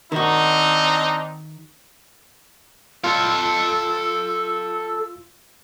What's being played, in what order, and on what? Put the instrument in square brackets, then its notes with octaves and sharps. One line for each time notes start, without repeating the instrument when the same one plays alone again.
[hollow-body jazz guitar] D#3 F#4 [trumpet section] C4 D4 D#4
[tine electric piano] F4 [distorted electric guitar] A4 F5 [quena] E6